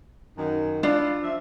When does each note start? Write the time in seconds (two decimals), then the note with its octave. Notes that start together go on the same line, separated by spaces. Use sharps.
0.38 F#2 D#3
0.83 D4 E4 F4
1.23 F3 E5